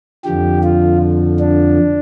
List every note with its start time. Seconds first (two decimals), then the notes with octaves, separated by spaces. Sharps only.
0.25 F2 D3 F3 G4
0.63 F4
1.39 D4